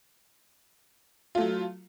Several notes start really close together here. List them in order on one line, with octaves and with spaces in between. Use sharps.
F4 A3 F#3